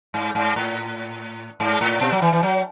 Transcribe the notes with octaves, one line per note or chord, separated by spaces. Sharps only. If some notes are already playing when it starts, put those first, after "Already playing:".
G#2
G#2
A2
G#2
A2
B2
F#3
E3
E3
F#3